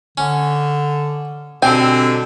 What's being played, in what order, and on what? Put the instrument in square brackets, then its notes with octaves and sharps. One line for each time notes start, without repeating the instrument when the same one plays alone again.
[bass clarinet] D3 [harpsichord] C#4
[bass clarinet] B2 [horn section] D3 G3 C4 [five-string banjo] G5 [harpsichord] G#5 A#5